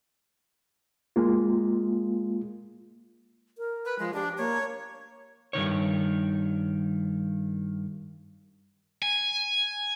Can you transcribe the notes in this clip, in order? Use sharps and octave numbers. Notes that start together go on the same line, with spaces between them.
G#3 A#3 F4
A#4
B4
F3 G#3
D4 G4
A#3 C#5
G2 C3 D#3 C#5
G#5